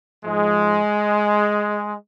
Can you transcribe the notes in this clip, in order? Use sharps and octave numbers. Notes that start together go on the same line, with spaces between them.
G#2 F3 G#3